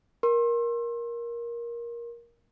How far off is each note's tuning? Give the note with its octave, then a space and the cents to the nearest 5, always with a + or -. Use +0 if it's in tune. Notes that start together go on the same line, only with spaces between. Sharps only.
A#4 +15 C6 +35